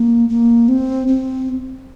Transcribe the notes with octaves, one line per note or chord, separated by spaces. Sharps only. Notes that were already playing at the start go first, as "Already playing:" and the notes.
Already playing: A#3
A#3
C4
C4